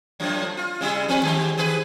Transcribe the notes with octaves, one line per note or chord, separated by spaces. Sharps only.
F#2 A2 F3
F4
C#3 G3 E4
F3 C4 B4
D#3 G#3 G4
D#3 G#4 B4